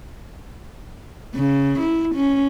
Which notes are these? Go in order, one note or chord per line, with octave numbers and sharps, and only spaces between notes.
C#3
E4
C#4